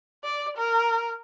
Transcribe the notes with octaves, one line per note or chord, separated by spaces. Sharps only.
D5
A#4